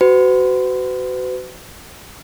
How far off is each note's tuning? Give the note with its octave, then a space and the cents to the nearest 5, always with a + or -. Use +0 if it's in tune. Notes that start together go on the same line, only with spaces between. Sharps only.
F#4 +20 B4 +40